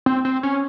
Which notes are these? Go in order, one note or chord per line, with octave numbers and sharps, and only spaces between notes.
C4
C4
C#4